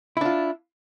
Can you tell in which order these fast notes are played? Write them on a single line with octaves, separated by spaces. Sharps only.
E4 D4 F4